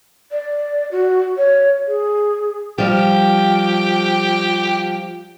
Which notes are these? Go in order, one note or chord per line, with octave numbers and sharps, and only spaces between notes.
D5
F#4
C#5
G#4
F3 G3 G4